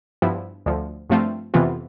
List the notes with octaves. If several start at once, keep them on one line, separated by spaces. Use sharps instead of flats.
G2 F3 B3 E4
D2 D3 F3
G2 F3 A3 C4 F4
F2 C3 E3 B3 F4